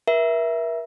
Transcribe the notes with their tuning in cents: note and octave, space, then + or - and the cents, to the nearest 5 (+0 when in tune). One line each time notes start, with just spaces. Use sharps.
A#4 +40 E5 +0